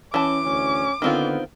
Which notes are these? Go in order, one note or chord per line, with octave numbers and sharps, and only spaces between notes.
E3 C#4 A5 D6
D2 C#4
D3 D#3 B3 C4 F4